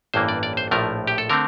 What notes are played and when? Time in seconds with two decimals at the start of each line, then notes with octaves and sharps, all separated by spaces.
0.14 A1 G2 E3 A#3 C5
0.28 D5
0.43 D5
0.57 C5
0.71 A#1 A2 F3 A3 A#4
1.07 G4
1.18 A4
1.30 D3 A3 C4 A#4